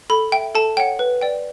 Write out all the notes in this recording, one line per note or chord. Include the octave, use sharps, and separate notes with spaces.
A4 B5
E5 G5
A4 A5
C#5 F#5 G5
B4
D5 G5